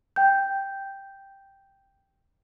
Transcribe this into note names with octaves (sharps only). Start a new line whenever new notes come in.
G5 G6